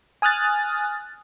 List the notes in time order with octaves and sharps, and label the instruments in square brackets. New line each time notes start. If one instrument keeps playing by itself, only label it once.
[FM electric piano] G#5 D#6 F6 F#6 A6